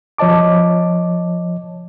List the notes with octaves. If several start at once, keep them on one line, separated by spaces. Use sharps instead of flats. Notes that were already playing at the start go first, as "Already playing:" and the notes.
F3 C#5 D#5 A5 D6